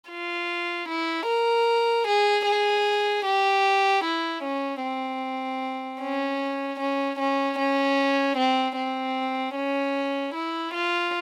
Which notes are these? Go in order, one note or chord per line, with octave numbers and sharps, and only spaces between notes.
F4
E4
A#4
G#4
G#4
G4
E4
C#4
C4
C#4
C#4
C#4
C#4
C4
C4
C#4
E4
F4